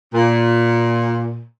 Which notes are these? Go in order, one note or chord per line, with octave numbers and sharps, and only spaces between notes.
A#2